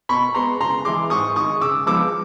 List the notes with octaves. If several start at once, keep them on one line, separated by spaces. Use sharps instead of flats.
B2 B5 C#6
G#3 B3 A#5 C6
C#3 A#5 C6
E3 G#3 C6 D6
G#2 C#6 D#6
D#3 G#3 C#6 D#6
C#3 D6 E6
F3 G#3 B3 D#4 D6 E6